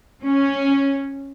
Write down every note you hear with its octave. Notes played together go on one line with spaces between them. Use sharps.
C#4